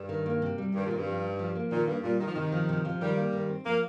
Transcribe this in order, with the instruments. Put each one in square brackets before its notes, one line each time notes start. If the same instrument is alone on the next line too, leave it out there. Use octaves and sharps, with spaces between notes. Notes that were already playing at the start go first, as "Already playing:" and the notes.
Already playing: [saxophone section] G2
[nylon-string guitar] D#3
A#3
C3
G3
[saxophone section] G2 [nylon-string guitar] D#3
[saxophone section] A#2
[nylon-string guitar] C4
[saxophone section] G2
[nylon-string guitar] F3
D#4
F3
A#3
[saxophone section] A#2 [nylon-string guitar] D#3
[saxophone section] G2 [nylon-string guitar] A#3
[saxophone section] A#2 [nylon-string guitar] G3
[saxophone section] D#3 [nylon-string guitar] D#4
[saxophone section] F3
[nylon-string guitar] C3 [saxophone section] D#3
[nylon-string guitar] F3
C3
F3
[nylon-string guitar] D#3 [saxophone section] G3
[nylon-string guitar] A#3
D#3
C4
[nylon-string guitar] F3 [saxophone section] A#3